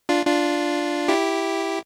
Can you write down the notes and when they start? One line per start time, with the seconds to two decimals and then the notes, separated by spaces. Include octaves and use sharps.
0.09 D4 F4
0.26 D4 F4
1.08 E4 G4